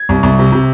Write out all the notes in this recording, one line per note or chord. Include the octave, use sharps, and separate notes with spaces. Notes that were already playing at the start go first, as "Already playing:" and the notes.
Already playing: G#6
C2
C2
C3
C3